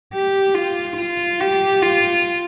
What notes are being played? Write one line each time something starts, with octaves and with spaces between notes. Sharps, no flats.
G4
F4
F4
G4
F4